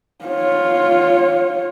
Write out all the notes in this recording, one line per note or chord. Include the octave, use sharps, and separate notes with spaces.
F4 C#5